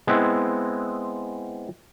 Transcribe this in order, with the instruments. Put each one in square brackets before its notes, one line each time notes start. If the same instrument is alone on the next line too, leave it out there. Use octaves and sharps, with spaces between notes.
[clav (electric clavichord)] G#3 B3 C4 E4